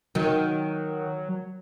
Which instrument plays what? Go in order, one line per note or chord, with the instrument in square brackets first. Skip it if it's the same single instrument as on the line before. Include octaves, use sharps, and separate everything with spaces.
[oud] D#3 [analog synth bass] F#3